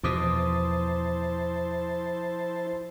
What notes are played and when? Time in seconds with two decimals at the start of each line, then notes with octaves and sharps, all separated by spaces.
0.04 E2 B2 F3 E4 C5 A5 D6 D#6